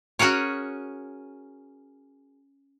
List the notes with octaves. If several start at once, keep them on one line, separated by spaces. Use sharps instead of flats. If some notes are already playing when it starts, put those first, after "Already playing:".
C#4 F#4 G#4 A#4 C#5